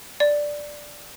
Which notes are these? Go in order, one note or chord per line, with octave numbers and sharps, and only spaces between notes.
D5